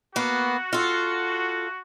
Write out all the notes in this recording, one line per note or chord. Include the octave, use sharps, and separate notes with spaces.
A#3 B3 F#4
F4 A4